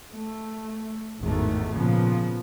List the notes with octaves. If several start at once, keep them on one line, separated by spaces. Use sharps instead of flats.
A3
G#1 E2 A2 D#3 A3
A#2 C#3 F3 B3